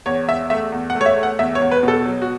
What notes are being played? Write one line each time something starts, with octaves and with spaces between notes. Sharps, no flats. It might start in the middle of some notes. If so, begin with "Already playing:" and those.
E2 C#5
E2 E5
A3 E5
E2
F#5
A3
C#5
E5
A3
F#5
E2 E5
C#5
E2
B4
B2
A4
F#3
F#4